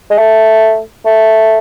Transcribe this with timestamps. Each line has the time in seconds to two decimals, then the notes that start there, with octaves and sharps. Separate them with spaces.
0.11 G#3
0.18 A3
1.05 A3